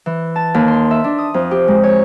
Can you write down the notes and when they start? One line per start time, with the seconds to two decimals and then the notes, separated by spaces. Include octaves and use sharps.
0.06 E3
0.36 A5
0.54 D#2
0.68 C6
0.91 E5
1.04 D4
1.18 D#6
1.34 F2
1.51 G4
1.68 G#3
1.84 C#5